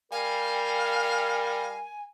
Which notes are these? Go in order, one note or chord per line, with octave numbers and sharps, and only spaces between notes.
G3 A#4 F5 G#5